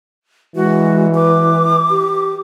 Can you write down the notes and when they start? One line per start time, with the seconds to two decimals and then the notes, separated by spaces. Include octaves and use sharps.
0.56 E3 G#3 F#4
1.15 B4 D6
1.91 G4